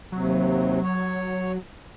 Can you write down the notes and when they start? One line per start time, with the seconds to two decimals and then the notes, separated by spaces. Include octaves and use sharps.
0.12 D#2 C3 F#3
0.82 C#5